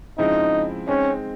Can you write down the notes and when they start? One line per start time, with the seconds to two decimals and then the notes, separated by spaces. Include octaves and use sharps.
0.18 C#3 F3 G#3 C4 D#4 E4
0.88 G#3 C4 C#4 D#4